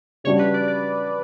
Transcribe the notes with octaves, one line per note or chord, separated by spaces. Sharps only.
C#3 G3 D4 F#4 C#5
B4
D5
D5